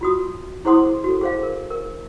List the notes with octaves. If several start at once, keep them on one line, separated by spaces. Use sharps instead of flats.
F4 F#4 D#6
E4 G#4 C5 F#5 C6 D#6
F#4 A4
G#4 C5 F5
A#4
A#4